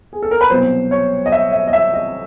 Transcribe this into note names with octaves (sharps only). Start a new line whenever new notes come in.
G#4
A4
A#4
B4
C2 B2 F#3 C5
C#5
D#5
E5
E5
D#5
E5
D#5